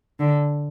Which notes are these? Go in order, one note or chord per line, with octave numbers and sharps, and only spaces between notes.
D3